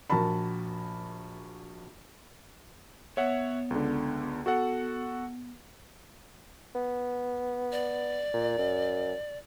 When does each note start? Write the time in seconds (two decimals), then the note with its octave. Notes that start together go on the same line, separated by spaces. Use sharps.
0.10 A#1 F#4 A#4 A5 B5
3.17 B3 C#5 E5 F#5
3.71 C#2 D3
4.46 B3 F#4 A4 F#5
6.75 B3
7.72 D5
8.34 A#2
8.58 F#2